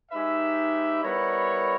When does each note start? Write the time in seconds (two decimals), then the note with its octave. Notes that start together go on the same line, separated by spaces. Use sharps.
0.12 G#3 D#4 G4 B4 E5
1.03 G3 B3 E4 A#4 C#5